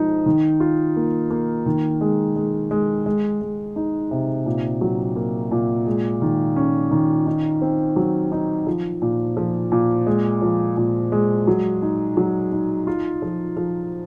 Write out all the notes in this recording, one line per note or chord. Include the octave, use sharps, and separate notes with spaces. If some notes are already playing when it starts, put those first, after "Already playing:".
Already playing: F3 G#3 D#4
D#3
F4
A#3
A#3
D#3
G#3
G#3
G#3
G#3
G#3
D#4
C3
A#2
F#3
A#3
A#2
G#3
D#3
C#4
D#3
D#4
C4
F#3
D#4
F3
A#2
F3
A#2
G#3
F3
A#2
G#3
F#3
D#4
F#3
D#4
F4
F3
F3